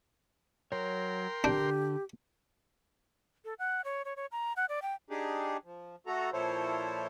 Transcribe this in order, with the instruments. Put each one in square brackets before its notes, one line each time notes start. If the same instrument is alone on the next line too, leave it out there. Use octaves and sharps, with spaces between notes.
[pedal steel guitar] F#3 C#5 [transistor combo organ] A#4 G5 C6
[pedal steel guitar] D3 G6 [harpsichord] D4 [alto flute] G4
[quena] A4
F#5
C#5
C#5
C#5
A#5
F#5
D5
G5
[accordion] D4 D#4 G4 G#4
F3
A3 F#4 A4 A#5
A#2 F3 E4 A4 C5 C#5